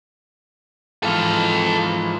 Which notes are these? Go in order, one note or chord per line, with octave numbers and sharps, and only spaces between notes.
G#2 E3 F3 A4 F5